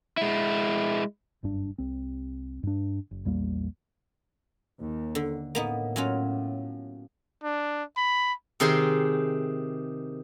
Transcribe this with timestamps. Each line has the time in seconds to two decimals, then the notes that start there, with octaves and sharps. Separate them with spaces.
0.17 G#3 E4
1.43 F#1 G2 D4
1.78 C2 C4
2.63 G2 D4
3.11 F#1
3.25 A#1 E2 G3 A#3
4.81 D#2
5.15 D3
5.55 A2 A#3 B3 D#4
5.96 F#3 C#4 F4
7.44 D4
7.97 B5
8.60 C3 D#3 D#4 G#4 C5 C6